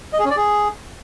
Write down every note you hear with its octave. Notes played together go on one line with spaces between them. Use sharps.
D#5
G#4
C#4
D5
G#4